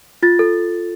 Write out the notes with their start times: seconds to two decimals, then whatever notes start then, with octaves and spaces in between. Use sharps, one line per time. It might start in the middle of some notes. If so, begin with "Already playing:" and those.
0.23 F4 A6
0.39 A4